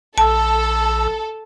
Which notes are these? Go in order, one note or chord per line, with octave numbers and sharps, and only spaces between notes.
A#1 A4 A5 E6